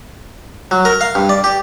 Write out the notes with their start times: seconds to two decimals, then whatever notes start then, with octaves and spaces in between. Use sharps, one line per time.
0.71 F#3
0.85 A#4
1.01 F5
1.15 G2
1.29 D5
1.44 G4